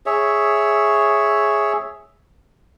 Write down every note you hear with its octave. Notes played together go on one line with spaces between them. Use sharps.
G#4 C#5 E5